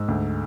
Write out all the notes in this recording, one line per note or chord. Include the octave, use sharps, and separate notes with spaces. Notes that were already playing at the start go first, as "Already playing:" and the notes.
Already playing: G#2 E6
D2